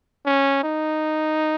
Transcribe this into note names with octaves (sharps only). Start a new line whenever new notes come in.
C#4
D#4